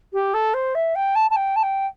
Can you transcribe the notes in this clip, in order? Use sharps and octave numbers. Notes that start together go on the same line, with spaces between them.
G4
A4
C5
E5
G5
A5
A5
G5
A5
G5